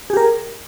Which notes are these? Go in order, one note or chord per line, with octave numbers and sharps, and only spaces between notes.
G4 G#4 A#4